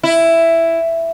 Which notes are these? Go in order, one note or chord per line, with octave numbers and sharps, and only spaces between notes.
E4